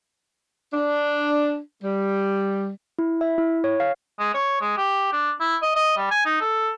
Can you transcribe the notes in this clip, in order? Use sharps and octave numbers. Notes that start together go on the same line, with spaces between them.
D4
G3
E4
E5
E4
C#5
F5
G#3
C#5
G#3
G4
D4
E4
D#5
D#5
G3
G#5
D#4
A4